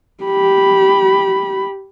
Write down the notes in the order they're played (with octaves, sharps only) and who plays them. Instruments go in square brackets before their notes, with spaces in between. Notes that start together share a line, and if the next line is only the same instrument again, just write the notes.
[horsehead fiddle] G4 B5